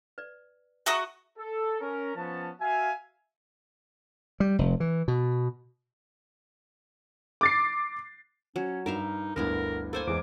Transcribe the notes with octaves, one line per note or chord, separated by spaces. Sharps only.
B4 D5
F#4 G#4 E5 A#5 C#6 D#6
A4
C#4 A#4
F3 B3 C#4 A5
F#4 E5 F5 G#5
G3
F1
E3
B2
D6 A6 C7
F#3 C#4
G2 D#4 A#4 E5 F5
G1 D2 B3 D4 E4 A#4
A#3 A4 C5 G#5
E2 E3 G#3 D6